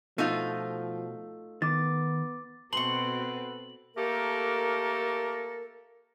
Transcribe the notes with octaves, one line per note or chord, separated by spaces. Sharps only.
B2 F3 A3 D#4 F4
D#3 B3 D6 A6
B2 C4 F#4 A4 B4 C6 C#6 F#7
A3 A#3 G4 A4 A#4